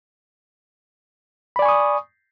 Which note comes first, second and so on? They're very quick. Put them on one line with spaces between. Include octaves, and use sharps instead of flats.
B5 D5 G#5 C#6 D#6